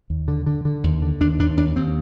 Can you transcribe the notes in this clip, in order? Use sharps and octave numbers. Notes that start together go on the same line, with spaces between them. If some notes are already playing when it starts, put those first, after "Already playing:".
D#2
D3
D3
D3
D#2
D3
D#2 D4
D#2 D4
D#2 D4
D#2 C4